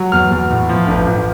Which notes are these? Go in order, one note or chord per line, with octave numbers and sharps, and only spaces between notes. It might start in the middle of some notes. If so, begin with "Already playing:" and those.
Already playing: F#3
E2 F6
E2
A2
F3
A1
A1